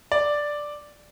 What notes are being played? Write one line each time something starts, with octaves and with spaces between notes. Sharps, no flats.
D5